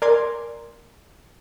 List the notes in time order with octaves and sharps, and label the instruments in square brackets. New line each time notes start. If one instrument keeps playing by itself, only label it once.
[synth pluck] A#4 D5 G#5 C6